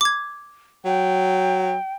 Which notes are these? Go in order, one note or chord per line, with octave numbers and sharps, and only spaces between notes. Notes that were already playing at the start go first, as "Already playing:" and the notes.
D6 G#6
F#3 G5